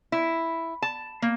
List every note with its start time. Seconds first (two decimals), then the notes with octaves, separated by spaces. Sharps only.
0.12 E4
0.82 A5
1.22 A#3